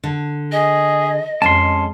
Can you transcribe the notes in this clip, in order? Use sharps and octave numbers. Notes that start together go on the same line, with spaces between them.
D3
G#4 D#5
F2 G#3 C#4 A5 C6